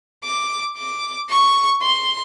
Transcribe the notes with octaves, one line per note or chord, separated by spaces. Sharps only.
D6
D6
C#6
C6